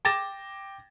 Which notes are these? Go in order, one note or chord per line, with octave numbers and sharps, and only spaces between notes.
G5 D6 A6 A#6 E7